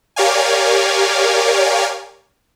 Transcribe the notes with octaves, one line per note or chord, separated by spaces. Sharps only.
G4 A#4 C#5 D5 F5 G#5